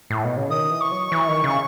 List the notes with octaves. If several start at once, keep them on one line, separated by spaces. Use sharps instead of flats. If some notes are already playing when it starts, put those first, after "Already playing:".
A2
B2
C#3
D#3 D#6
E3
C#6
F#3
E3
D#3
C#3